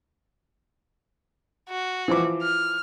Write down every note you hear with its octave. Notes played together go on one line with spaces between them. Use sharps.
F#4
E3 F3 D6
F6